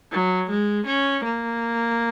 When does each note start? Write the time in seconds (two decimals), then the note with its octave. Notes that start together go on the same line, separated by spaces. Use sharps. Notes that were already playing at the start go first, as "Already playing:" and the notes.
0.12 F#3
0.50 G#3
0.87 C#4
1.24 A#3